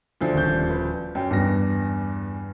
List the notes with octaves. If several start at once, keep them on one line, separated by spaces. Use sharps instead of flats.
D2 F3 D4
D#1 G6
B4
F#2 G5
E2 G2 A#6